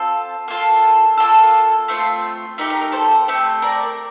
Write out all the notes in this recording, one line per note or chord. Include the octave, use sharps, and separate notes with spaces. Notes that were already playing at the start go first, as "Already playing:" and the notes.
Already playing: C4 F4 A4
A#3 F4 A4
A#3 F4 A4
A3 C4 F4
A3 D#4 G4 A#4
A#4
A#4
A4 C5
A3 C4 G4
A#4 D5